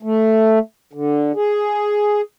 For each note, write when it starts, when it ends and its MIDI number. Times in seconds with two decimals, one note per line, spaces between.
0.03 0.59 57
0.93 1.32 50
1.35 2.21 68